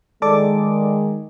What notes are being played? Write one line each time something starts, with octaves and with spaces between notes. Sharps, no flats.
D#3 G#3 A4 D5 D6